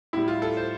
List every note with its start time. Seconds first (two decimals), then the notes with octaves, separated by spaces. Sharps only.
0.13 A2 G3 E4
0.28 F4
0.42 A4
0.57 C5